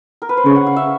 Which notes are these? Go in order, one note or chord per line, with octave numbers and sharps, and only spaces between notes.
A#4
B4
C5
C#3 C#5
F#5
F5
E5